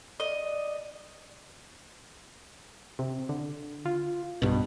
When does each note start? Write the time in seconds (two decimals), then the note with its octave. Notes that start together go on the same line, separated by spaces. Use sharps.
0.20 D5 D#5
2.99 C3
3.29 D3
3.86 F4
4.42 B1 G2 B2